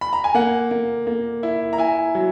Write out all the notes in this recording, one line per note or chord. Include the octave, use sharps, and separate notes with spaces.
B5
A#5
G#5
A#3 F#5
A#3
A#3
E4
A#5
E4 G#5
F#3